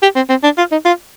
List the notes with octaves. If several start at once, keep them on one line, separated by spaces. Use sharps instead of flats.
G4
C4
C4
D4
F4
D#4
F4